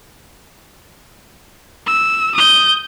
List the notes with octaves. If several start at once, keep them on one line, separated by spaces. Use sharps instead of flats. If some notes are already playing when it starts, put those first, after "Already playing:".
E6
D#6 G6